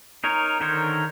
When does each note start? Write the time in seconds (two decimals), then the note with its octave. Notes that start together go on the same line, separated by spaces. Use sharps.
0.24 D#4 A#4 C#5
0.60 D3 D#3 A#4 C5 C#5